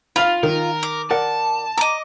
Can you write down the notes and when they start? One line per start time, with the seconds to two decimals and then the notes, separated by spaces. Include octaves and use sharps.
0.16 F4 F5 B5
0.43 D#3 A#4
0.83 D6
1.11 A#4 D5 F#5 A5
1.78 D#5 A#5 D6